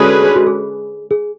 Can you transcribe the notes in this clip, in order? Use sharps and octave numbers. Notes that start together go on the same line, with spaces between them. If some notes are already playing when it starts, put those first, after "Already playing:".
Already playing: D3 G#3 C#4 F#4 G#4 B4
F#4
G#4
G#4